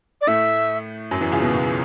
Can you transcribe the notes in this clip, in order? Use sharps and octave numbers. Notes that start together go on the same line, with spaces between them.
D5
A2 A3 E5
F#2 F#3
E2 E3
C#2 C#3
B2
B2